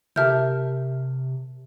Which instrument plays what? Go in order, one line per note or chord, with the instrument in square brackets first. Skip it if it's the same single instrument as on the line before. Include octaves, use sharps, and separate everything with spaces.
[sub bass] C3 [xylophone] G4 F6 G6 [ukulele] A#4 E5 A5